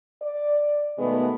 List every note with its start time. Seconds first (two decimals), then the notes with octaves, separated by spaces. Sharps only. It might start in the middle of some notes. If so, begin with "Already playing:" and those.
0.22 D5
0.99 B2 D#3 G#3 A3 B3